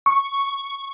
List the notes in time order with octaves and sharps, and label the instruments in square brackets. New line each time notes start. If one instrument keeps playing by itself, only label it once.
[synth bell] C#6